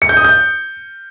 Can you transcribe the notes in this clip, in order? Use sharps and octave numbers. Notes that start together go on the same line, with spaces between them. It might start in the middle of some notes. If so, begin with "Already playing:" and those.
C#7
G6
D#6
G6